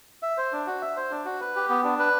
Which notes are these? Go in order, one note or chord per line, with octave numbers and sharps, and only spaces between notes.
E5
C5
D4
F#4
E5
C5
D4
F#4
B4
G4
B3
D4
B4